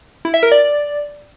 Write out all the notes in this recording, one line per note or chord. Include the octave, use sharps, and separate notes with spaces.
E4
E5
A#4
D5